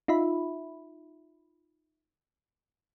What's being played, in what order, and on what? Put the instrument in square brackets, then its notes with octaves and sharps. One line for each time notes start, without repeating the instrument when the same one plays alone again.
[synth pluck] D#4 F4 E5 B5